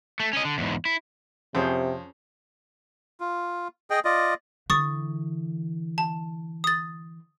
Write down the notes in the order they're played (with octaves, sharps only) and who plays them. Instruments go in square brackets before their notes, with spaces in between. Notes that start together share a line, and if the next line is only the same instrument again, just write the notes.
[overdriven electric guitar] A3
C#4 D#5
D3
E2 G#2
E4
[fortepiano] F2 [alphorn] C3 [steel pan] C#4 G#4 C5
[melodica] F4
G#4 D#5 G5
F4 D5 D#5
[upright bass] D3 E3 [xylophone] C#6 D#6 A6
[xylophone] A5
D#6 A6